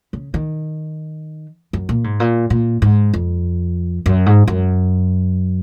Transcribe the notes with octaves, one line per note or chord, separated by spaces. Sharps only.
C#3
D#3
F#2
A#2
G#2
A#2
A#2
G#2
F2
F#2
G#2
F#2